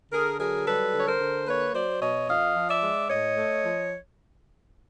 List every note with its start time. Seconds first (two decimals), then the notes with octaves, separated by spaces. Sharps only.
0.12 D3 G#4 A#4
0.39 F#3 G#4 A#4
0.66 G3 A4 B4
0.94 D3 C#5
1.06 A#4 C5
1.20 D3
1.47 A#3 B4 C#5
1.74 F#3 C5 D5
2.01 B2 C#5 D#5
2.29 F2 D#5 F5
2.56 F3
2.69 D5 E5
2.83 G#3
3.10 A2 C#5 D#5
3.37 A3
3.63 F3